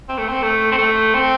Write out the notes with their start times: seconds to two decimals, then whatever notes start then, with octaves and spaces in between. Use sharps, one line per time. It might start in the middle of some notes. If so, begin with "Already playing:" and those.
0.09 C4
0.18 A3
0.28 C4
0.43 A3
0.71 C4
0.78 A3
1.14 C4